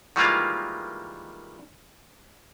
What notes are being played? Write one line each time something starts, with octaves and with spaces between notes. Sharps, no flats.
D#3 E3 G3 G#3 A#3 F4